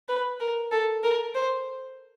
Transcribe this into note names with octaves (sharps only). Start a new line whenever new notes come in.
B4
A#4
A4
A#4
C5